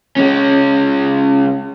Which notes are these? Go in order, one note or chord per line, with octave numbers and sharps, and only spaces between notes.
G#3 C#4